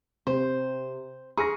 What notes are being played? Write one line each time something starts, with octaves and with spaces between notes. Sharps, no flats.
C3 C5
G#4 C#6 F6 A#6